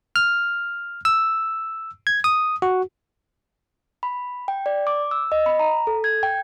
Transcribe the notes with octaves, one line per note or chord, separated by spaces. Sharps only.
F6
E6
G#6
D#6
F#4
B5
G5
D5
D6
E6
D#5
B5
A#5
A4
G#6
G5